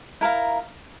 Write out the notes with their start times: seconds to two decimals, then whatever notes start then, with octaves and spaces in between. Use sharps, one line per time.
0.21 E4 A#4 F5 A#5